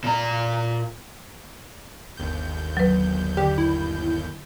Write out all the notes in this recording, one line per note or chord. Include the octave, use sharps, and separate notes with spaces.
A#2 A#5
G1 D#2 G6
F#3 B4
D3 G4 G5
E4